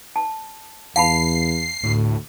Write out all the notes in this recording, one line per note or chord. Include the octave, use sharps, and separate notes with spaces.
A5
E2 F5 A5 B5 C7
D2 A2